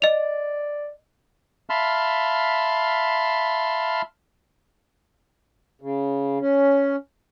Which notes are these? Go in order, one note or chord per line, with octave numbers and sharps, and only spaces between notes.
D5 D#5 F7
E5 F5 A5 B5 C6 F6
C#3
C#4